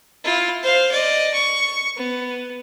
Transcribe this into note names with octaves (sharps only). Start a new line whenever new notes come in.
E4 F4
C5 F5
D5 D#5
C#6
B3